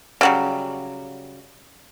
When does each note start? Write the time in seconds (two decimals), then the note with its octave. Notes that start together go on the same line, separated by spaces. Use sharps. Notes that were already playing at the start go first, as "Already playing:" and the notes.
0.21 C#3 F#3 G3